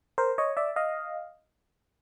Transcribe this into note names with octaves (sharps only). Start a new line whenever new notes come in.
A#4 C5
C#5 D#5
D5 E5
D#5 F5